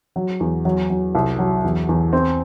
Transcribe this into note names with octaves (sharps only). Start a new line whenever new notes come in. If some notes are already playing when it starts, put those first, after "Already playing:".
F#3
E2
F#3
F#3
C2
F#3
E2
E2
C4